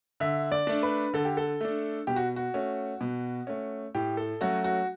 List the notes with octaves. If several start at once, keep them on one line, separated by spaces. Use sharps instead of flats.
D3 E5
D5
A3 D4
B4
D3 A4
G4
A4
A3 D4
B2 G4
F#4
F#4
A3 C#4
B2
A3 C#4
A2 G4
A4
F#3 A3 C#4 F#4
F#4